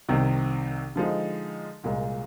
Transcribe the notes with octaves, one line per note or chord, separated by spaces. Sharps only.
C2 C3 D#3
D3 F3 G#3 D#4
C2 A#2 G#3